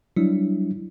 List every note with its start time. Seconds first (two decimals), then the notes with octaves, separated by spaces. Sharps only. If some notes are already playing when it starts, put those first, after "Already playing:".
0.16 F#3 G3 D4 E4